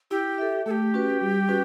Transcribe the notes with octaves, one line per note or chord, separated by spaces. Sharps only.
E4 G4
A4 E5
A3 G4 A4
C#4 F#4 B4
G3
C#4 F#4 B4